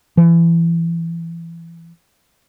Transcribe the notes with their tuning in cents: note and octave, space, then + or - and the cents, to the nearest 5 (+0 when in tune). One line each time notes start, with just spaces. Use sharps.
E3 +25